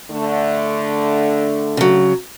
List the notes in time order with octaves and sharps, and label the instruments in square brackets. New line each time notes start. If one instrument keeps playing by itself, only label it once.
[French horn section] D3 A3
[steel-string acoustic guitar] C#3 F#3